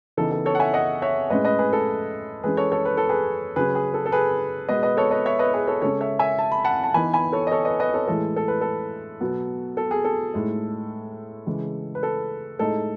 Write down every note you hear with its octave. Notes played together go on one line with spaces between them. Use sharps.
C#3 E3 B3 D#4 A4
A4
A4 C#5
F#5
E5 G#5
D#5 F#5
C#5 E5
A2 G#3 C#4 B4 D#5
B4 D#5
G#4 B4
A4
E3 G#3 C#4 G#4 B4
A4 C#5
A4 C#5
B4
A4
G#4 B4
C#3 F#3 C#4 G#4 B4
G#4
A4
A4
G#4 B4
B2 G#3 B3 B4 D#5
B4 D#5
A4 C#5
B4 D#5
C#5 E5
B4 D#5
G#4 B4
A4 C#5
C#3 G#3 C#4 A4 C#5
C#5 E5
E5 G#5
A5
B5
F#5 A5
A5
E3 B3 D#4 G#5 B5
G#5 B5
A4 C#5
D#5
A4 C#5
B4 D#5
B4 D#5
A4 C#5
A2 E3 G#3 A4
A4
B4
A4
B2 F#3 B3
A4
G#4
A4
A2 G#3 D#4
C#3 E3 G#3
B4
A4
A2 G#3 D#4 A4